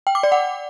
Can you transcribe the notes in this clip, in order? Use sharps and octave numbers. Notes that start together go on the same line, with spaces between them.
G5
D6
D5
F#5